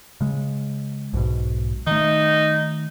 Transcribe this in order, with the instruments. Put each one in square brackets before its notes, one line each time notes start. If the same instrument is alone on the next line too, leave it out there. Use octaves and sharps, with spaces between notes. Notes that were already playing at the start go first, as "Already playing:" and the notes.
[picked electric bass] C#3 G#3
B1 G#2 B2
[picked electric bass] D#3 A3 [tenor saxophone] D#4